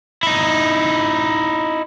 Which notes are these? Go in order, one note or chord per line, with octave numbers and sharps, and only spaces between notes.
D#4 E4